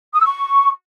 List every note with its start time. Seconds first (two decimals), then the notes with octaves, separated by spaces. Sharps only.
0.14 D#6
0.19 E6
0.24 C#6